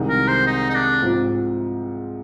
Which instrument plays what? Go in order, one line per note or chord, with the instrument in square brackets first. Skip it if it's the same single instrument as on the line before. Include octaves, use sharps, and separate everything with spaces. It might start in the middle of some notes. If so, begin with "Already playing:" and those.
Already playing: [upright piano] C2 C3 D#3 G#3 D#4
[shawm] A#4
C5
D#4
D#4
D4
[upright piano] G#2 F3 C4 F4